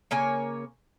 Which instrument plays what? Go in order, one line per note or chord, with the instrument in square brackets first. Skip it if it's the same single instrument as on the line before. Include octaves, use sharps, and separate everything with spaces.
[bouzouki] C#3 A#3 C#5 G#5